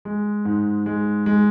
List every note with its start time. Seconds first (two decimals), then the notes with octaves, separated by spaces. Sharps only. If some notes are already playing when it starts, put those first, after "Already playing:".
0.05 G#3
0.45 G#2
0.86 G#3
1.26 G#3